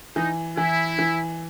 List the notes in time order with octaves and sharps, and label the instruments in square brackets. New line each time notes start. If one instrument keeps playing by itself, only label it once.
[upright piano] E3 [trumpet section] D#4
[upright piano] E3 [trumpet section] E4
[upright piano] E3